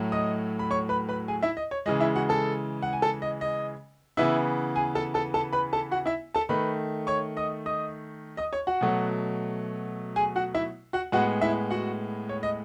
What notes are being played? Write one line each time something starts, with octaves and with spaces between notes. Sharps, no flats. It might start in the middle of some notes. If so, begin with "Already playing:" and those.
Already playing: A2 F#3 A3
D#5 D#6
B5
C#5 C#6
B4 B5
B4 B5
G#4 G#5
E4 E5
D#5
C#5
C#3 E3 G#3 D#5
E4 E5
F#4 F#5
A4 A5
F#5
G#5
A4 A5
D#5
D#5
C#3 E3 B3 E4 E5
G#4 G#5
A4 A5
A4 A5
A4 A5
B4 B5
A4 A5
F#4 F#5
E4 E5
A4 A5
D#3 A3 B4 B5
C#5 C#6
D#5 D#6
D#5 D#6
D#5 D#6
C#5 C#6
F#4 F#5
B2 F#3 A3
G#4 G#5
F#4 F#5
E4 E5
F#4 F#5
A2 G#3 B3 F#4 F#5
E4 E5
F#4 F#5
C#5
D#5